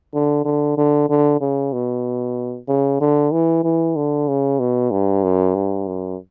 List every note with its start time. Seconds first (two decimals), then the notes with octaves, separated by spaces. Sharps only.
0.14 D3
0.45 D3
0.77 D3
1.09 D3
1.41 C#3
1.73 B2
2.68 C#3
3.01 D3
3.32 E3
3.64 E3
3.96 D3
4.28 C#3
4.60 B2
4.91 G2
5.23 F#2
5.55 G2
5.87 F#2